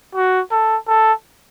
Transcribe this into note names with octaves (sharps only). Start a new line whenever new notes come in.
F#4
A4
A4